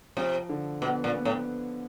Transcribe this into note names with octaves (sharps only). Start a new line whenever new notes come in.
C3 F3
D3
B2 B3
A#2
B3
A2